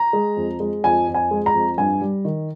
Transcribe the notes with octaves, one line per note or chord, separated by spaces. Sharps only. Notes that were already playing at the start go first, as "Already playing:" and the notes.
Already playing: A#5
G#3
F2
G#3
F2 G#5
F2
G#5
G#3
A#5
F2
G2 G#5
G3
D#3